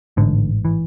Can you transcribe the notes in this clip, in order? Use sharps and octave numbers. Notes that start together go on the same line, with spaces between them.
A1 G#2 D3
E3